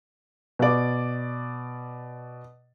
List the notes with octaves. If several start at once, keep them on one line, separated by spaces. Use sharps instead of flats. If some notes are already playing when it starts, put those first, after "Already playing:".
B2 D5